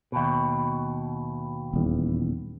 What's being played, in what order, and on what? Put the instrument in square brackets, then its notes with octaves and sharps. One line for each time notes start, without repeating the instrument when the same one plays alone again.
[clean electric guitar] D#2 B2
[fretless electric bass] D#1 E2